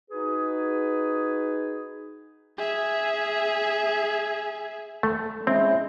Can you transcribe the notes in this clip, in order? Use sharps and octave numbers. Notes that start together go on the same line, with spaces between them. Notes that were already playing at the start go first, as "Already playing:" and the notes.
D#4 F#4 G#4 B4
G#4 E5
A3
G#3 C4 C#4 E4